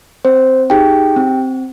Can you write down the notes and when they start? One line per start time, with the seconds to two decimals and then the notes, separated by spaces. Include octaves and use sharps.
0.25 C4 C5
0.70 D#4 G4 G#4 G5
1.16 C4